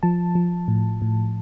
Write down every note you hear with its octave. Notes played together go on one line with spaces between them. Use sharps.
F3 A5
F3
A2
A2